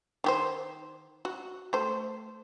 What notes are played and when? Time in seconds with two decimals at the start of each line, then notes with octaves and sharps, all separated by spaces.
0.24 D#3 G4 C5
1.25 F#4
1.73 A3 C5